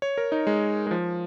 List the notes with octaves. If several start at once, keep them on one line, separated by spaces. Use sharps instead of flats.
C#5
A#4
D#4
G#3
G#3
F3